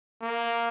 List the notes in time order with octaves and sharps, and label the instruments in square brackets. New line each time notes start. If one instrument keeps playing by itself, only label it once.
[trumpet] A#3